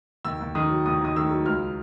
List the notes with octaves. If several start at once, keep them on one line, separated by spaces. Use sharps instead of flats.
D#2 E6
D#2
D#3 D#6
F#3
D#2 D#6
D#2 D#6
D#3 E6
F#3
C#2 F6